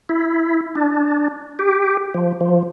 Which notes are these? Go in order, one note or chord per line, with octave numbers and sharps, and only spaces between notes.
E4
D4
G4
F3
F3